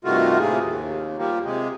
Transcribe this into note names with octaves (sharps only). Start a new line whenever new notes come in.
G2 C3 D#3 A3 F4 F#4
A2 C3 A#3 G#4
D#2
F3 G3 A#3
C3 G#3